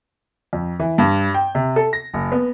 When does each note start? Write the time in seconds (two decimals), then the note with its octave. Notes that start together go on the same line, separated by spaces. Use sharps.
0.53 F2
0.79 E3
0.98 G2
1.34 G5
1.55 C3
1.76 A4
1.93 A#6
2.14 F#1
2.32 B3